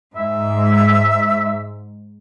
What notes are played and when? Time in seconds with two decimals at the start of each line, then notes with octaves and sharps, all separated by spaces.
0.16 G#2 E5